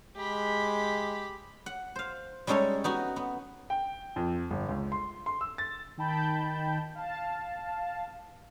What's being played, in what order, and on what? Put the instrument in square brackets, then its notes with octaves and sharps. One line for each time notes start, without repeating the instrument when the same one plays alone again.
[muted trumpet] G#3 [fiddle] G4 B5
[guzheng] F#5
C5 F5
G3 G#3 C#4 D#4 A4 C#5
B3 D#4 F#4
B3
[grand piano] G5
F2
G1
C#2
C6
C6
E6
A6
[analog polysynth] D#3 D#4 G5 A5 B5 G6
F5 A5